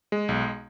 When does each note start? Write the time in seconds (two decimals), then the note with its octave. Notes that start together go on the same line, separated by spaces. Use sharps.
0.12 G#3
0.29 B1